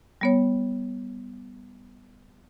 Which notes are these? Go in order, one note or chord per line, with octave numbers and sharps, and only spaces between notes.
G3 B3 C#5